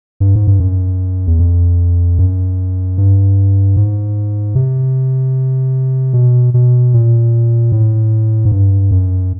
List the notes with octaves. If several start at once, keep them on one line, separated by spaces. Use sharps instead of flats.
G2
G#2
G2
F#2
E2
F2
F#2
G2
G#2
C3
B2
B2
A#2
A2
G#2
G2
F#2